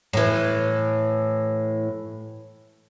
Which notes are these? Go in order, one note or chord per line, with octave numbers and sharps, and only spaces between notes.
A2 E3